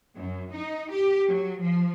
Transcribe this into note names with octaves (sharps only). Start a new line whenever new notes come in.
F#2
D#4
G4
F#3
F3